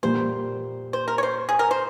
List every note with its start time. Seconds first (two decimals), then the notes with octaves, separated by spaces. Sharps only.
0.03 A#2 G3 A#3 C5
0.93 C5
1.08 A#4
1.18 C#5
1.23 C5
1.49 G#4
1.59 A#4
1.71 C5